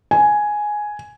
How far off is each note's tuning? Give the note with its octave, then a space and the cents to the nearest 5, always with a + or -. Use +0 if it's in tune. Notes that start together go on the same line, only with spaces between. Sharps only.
G#5 +5